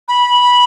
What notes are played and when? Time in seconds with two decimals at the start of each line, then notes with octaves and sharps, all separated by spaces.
0.08 B5